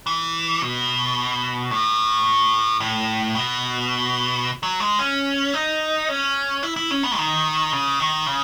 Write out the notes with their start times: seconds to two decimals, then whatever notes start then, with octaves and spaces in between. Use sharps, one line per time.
0.07 E3
0.62 B2
1.71 A2
2.80 A2
3.35 B2
4.63 F#3
4.80 G#3
4.99 C#4
5.54 D#4
6.09 C#4
6.63 E4
6.76 E4
6.91 C#4
7.04 B3
7.17 D#3
7.72 C#3
8.00 D#3
8.26 C#3